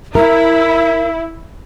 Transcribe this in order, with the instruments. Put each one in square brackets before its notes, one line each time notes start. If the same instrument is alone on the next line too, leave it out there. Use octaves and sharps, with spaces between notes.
[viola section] E4 [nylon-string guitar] A#4 [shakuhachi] E5